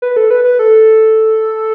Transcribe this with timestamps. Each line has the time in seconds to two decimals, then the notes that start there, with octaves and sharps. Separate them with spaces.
0.02 B4
0.17 A4
0.30 B4
0.44 B4
0.59 A4